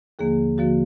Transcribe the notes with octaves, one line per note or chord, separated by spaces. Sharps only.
D#2 D3 F3 A#3 G#4
D#2 D3 F3 A#3 F#4